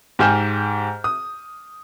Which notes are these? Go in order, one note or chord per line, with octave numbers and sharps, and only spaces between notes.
G#2 G4 G#5 F6 G6 E7
D#6